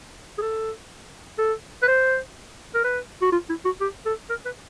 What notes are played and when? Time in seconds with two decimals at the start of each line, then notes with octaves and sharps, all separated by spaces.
0.38 G#4
0.42 A4
1.38 A4
1.83 B4
1.88 C5
2.74 A#4
2.84 B4
3.22 F#4
3.32 F4
3.49 E4
3.65 F#4
3.80 G4
4.06 A4
4.29 A#4
4.45 B4